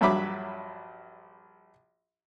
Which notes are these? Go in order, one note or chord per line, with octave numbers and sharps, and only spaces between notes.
A#1 G2 F#3 E5 B5 D6